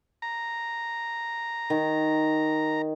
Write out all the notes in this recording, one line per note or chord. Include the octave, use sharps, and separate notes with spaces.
A#5
D#3